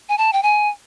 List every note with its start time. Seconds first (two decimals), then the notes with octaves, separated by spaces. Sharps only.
0.09 G#5
0.18 A5
0.33 G5
0.43 G#5